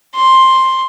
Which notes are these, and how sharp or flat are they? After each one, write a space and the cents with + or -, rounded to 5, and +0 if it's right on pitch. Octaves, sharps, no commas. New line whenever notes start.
C6 +5